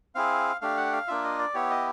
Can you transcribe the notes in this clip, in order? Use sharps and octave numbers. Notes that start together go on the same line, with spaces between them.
C4 E4 G#4 F5
A3 D4 G4 F5
F#5
F5
A#3 D4 F4 E5
D#5
D5
B3 E4 G4 C#5
D#5